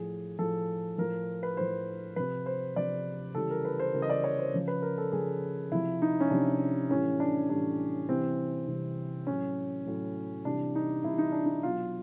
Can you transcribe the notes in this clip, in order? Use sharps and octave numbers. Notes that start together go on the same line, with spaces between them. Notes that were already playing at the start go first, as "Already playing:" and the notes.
Already playing: A2 F3 G#4
A2 F3 A4
A2 F3 A#4
B4
A2 F3 C5
C3 F3 B4
C5
C3 F3 D5
C#3 E3 G3 A4
A#4
B4
C5
C#3 E3 G3 A#4
D#5
D5
C#5
C5
C#3 F3
B4
A#4
A4
C#3 F3 G#4
C3 F3 E4
D#4
C#4
C3 F3 D4
A2 E3 G3 C#4
D4
A2 E3 G3 D4
C3 E3 G3 C4
C3 E3 G3
A2 F#3 C#4
A2 F#3
C3 E3 G3 D4
D#4
C3 E3 G3 E4
D#4
D4
D#4
B2 F#3 F4